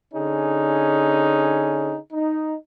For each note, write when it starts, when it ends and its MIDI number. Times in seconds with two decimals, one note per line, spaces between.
0.14 1.98 50
0.14 1.98 61
0.14 1.98 63
0.14 1.98 68
2.13 2.55 63